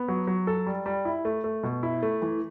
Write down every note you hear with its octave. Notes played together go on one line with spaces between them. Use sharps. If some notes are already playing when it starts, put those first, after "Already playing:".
Already playing: B3
F#3
F#3
A4
G3
G3
E4
A3
A3
B2
E4
A3
E3